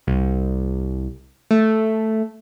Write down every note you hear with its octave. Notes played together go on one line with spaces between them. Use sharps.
C2
A3